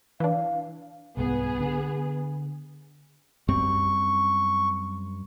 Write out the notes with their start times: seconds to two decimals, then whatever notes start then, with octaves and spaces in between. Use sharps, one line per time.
0.20 E3 D4 F5
1.17 C2 G#2 B3 G#4
1.60 D3
3.48 F#2 G3 C4 C#6